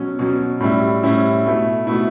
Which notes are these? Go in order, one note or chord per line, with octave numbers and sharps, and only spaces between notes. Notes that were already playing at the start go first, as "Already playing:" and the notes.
Already playing: B2 F#3 C#4
B2 F#3 C#4
A2 G3 C#4 E4
A2 G3 C#4 E4
B2 A3 E4
B2 A3 E4